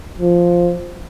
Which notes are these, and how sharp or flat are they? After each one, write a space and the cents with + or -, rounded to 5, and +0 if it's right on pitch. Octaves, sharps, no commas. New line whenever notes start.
F3 +0